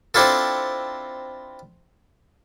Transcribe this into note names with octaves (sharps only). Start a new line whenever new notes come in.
C4 D4 E4 F4 A4